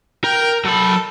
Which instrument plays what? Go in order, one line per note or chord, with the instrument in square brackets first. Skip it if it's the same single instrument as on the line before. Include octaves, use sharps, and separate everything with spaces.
[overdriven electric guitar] A#4 [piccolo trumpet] G5
[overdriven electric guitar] F#3 B5 [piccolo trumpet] A4